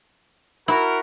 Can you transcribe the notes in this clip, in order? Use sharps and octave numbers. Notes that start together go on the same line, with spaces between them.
E4 F#4 A#4